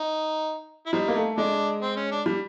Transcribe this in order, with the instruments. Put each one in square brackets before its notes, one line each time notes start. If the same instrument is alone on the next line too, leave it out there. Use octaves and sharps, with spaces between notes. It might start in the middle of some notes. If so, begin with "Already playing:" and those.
Already playing: [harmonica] D#4
E4
[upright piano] G3 [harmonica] C4 D#4
[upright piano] A#3
A3
[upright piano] G#3 [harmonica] D4
[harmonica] C4
C#4
D4
[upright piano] G3